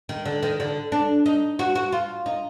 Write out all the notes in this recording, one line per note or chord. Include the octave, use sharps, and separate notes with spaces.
D#3
D3
D#3
D3
D4
D#4
F#4
F#4
F4
D#4